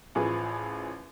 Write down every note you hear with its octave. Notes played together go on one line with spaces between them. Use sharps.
A1 F3 G#4 B4